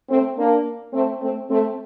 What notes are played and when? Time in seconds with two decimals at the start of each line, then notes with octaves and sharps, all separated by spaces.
0.09 A3 C4
0.37 A#3 D4
0.93 A3 C4
1.21 A3 C4
1.50 A3 C4